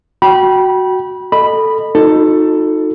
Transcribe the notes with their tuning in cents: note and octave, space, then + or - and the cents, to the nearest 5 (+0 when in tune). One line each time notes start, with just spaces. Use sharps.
F#4 +0 G5 -20 B5 -25
A4 +5 D#5 -20 B5 +0
D#4 +0 F#4 -45 A4 +15